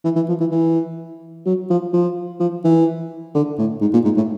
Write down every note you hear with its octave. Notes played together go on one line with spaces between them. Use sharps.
E3
E3
F3
E3
E3
F#3
F3
F3
F3
E3
D3
A2
G#2
A#2
G#2
A2